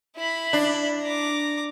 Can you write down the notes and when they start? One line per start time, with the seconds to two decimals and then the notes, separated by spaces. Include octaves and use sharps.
0.17 E4 B5
0.53 D4
1.02 A#5 D6